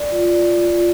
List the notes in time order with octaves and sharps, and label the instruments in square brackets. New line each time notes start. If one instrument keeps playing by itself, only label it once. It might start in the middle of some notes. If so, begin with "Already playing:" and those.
Already playing: [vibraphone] D5
F4
D5
F4
F4